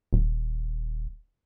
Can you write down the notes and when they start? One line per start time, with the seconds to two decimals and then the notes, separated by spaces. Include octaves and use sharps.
0.13 D#1